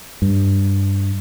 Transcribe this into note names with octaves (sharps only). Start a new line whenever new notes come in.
G2